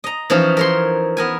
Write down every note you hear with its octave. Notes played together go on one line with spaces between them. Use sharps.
D#5 A#5
E3 F3 C#4 D#4 F5
A#4 C#5 C6
B3 A#4 G#5